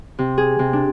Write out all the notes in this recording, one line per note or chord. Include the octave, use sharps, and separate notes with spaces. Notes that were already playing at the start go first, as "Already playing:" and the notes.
C3
G#4
C3
D4